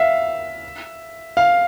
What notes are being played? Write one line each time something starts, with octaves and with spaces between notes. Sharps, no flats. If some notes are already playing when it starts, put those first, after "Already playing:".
Already playing: E5 F5
F5